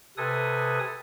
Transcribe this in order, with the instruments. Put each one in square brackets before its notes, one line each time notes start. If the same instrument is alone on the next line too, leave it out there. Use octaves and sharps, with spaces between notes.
[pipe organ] C3 A4 B4 G#5 D#6